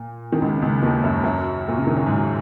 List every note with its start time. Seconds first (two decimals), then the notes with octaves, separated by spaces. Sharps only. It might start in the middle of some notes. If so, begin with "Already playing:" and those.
Already playing: A#2
0.32 D#3
0.41 C#2 C#3
0.62 C#2 C#3
0.82 D#2 D#3
1.03 F#2 F#3
1.23 F#2 F#3
1.68 A#2
1.77 C#3
1.87 D#3
1.97 F#3
2.06 G#2 G#3